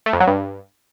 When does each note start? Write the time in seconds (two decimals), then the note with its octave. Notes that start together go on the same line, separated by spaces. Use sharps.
0.06 A3
0.13 F2
0.20 F#3
0.27 G2